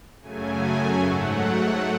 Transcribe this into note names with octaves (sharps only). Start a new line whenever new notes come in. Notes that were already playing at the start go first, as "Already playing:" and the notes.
F#2 C#3 F#3 A3 G#5
G#2 F#3 A3 F#5